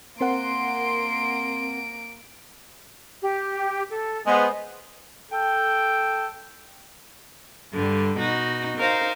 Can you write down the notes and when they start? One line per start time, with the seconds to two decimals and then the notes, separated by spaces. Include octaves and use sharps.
0.21 A#3 C4 A#4 F#5 C6 D7
3.22 G4
3.90 A4
4.26 G#3 B3 C5
5.32 A4 G5
7.71 G2 D3 G3
8.17 B2 D#4 F#4
8.76 D#4 A#4 C5 F5